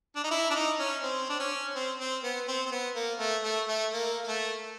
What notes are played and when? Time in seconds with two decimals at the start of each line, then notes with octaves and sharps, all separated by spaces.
0.16 D4
0.24 D#4
0.31 E4
0.50 D4
0.55 D#4
0.79 C#4
1.03 C4
1.29 D4
1.40 C#4
1.75 C4
1.99 C4
2.23 B3
2.48 C4
2.66 C4
2.72 B3
2.96 A#3
3.19 A3
3.44 A3
3.68 A3
3.92 A#3
4.24 A#3
4.28 A3